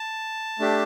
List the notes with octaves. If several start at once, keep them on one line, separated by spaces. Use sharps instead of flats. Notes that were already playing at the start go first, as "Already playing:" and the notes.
Already playing: A5
A3 D4 G4